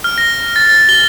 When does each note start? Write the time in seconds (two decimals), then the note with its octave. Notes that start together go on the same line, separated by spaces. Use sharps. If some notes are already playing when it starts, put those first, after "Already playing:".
0.04 F6
0.18 A#6
0.56 A6
0.69 A6
0.89 G7